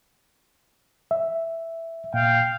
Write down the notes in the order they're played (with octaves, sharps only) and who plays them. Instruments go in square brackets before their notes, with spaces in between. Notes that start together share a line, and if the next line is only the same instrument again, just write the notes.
[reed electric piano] E5
[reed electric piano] A#2 [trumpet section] F5 G5